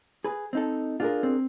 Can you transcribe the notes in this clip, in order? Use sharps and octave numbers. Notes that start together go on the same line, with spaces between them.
G#4 B4
C4 D#4 A4
D4 F4 G#4 A#4
C4